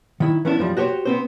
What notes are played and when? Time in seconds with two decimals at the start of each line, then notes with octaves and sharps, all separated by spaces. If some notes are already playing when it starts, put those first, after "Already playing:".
0.20 D#3 E4
0.45 E3 B3 C#4 D4 E4
0.59 F#2 F3 G3
0.77 F#4 G4 C5 C#5
1.05 B3 C4 C5